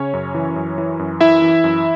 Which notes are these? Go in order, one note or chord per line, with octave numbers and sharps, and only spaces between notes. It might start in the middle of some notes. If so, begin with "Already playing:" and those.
Already playing: C#3 C#4 C#5
F#2
E3
F#2
E3
F#2
E3 E4 E5
E3
F#2